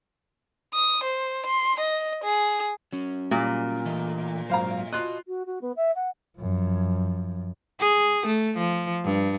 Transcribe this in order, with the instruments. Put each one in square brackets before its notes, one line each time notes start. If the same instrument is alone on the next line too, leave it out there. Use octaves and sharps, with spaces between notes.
[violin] D#6
C5
C6
D#5
G#4
[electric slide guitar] F#3 C#4
[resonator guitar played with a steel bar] A#2 [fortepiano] G3
[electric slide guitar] E3 A3 D#5
[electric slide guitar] G#2 C#3 F#3 [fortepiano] C5 F5 A#5
[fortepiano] F4 F#6 [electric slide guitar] F#4 D#5
[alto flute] F#4
F#4
B3
E5
F#5
[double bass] F#2 F3
[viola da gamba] G#4
A3
F3
G2